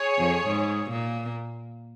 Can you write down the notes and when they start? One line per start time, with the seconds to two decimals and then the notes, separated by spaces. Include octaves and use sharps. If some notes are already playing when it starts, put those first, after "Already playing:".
Already playing: G#4 C#5
0.18 F2 F3
0.47 G#2 G#3
0.91 A#2 A#3